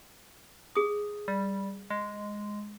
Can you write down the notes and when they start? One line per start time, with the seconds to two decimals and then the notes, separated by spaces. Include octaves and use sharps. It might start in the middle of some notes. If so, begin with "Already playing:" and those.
0.75 G#4 D#6
1.28 G3
1.90 G#3